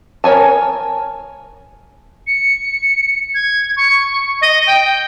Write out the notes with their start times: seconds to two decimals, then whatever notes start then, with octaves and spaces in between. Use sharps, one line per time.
0.24 A#4 C#5 G#5 A5
2.27 C#7
3.34 G#6
3.77 C#6
4.41 D#5
4.67 G5